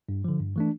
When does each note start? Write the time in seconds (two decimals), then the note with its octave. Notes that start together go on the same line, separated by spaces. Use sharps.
0.09 G2
0.24 D3 F3
0.40 G2
0.56 E3 A3 D4